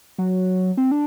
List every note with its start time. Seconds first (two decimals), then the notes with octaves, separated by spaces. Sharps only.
0.18 F#3
0.77 C4
0.91 D4